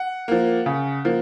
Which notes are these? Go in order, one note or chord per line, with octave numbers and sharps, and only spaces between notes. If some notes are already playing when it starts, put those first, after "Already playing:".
Already playing: F#5
F3 A#3
C#3
F3 A#3